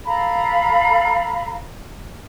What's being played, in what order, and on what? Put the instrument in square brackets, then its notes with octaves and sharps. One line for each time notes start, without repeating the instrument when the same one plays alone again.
[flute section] A4 F5 A#5 B5